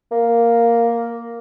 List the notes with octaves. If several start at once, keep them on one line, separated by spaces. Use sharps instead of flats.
A#3